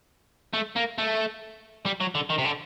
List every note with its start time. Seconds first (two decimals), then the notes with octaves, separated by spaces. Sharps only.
0.53 A3
0.76 A#3
0.98 A3
1.86 G3
2.01 F#3
2.15 D3
2.30 D#3
2.38 C3
2.45 D3